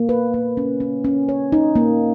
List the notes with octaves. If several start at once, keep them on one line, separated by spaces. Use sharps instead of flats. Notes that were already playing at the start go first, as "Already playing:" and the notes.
Already playing: A#3
B4
A#3
C#4
C#4
C#4
C#5
D#4
A#3